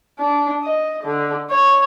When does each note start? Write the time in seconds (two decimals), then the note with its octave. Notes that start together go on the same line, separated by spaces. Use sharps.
0.20 D4
0.63 D#5
1.04 D3
1.50 C#5